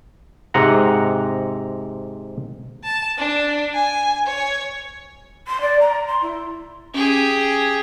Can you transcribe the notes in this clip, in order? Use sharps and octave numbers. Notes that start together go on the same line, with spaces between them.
G#2 C3 D#5 F#5 A#5
A5
D4
G#5
C#5
C6
D5
A#5
C6
E4
C#4 G4 G#4